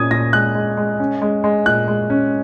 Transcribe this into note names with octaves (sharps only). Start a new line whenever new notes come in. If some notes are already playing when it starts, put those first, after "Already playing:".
Already playing: A#2 C#4 D#6 G#6
A#2 A#6
G#3 F#6
G#3
G#3
C#4
G#3
G#3
A#2 F#6
G#3
C#4